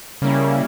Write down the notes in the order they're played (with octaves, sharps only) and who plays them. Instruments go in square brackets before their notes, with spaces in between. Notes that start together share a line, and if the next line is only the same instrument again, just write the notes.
[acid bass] C#3 [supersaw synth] G3 A#3 C#4 E4